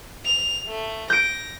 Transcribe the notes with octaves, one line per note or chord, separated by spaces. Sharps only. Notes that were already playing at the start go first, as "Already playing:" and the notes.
F7
A3
G6 A#6 D7